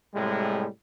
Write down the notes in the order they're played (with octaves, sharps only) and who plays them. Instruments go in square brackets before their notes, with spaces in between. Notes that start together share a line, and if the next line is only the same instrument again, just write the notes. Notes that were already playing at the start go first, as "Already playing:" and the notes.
[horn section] A2 C3 G3 G#3